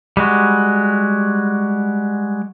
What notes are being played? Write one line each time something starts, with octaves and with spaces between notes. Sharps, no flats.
G3 G#3 F#4